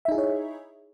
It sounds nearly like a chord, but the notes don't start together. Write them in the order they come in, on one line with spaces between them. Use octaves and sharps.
E5 D#4 G#4 E4 C#5